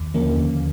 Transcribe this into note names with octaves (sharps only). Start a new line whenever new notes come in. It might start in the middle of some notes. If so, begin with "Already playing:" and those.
Already playing: D#2
D3 F3 A#3 C#4
D#2